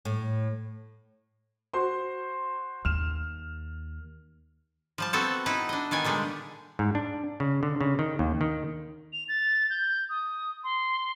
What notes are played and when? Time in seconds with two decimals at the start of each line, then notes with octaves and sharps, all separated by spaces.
0.05 A2
1.74 F#4 C5 C6
2.85 D#2 F6 E7
4.98 F3 G3 A5
5.13 B3 C4 F#4 A4 A5
5.46 D#4 E4 B4 F#5
5.69 D4 D#5
5.91 D#3 B3 D5 G#5
6.04 A#2 D3 G3 G#3
6.79 G#2
6.95 D4
7.40 C#3
7.63 D3
7.81 C#3
7.99 D#3
8.19 D#2
8.41 D#3
9.13 F7
9.29 A6
9.70 G6
10.10 D#6
10.64 C6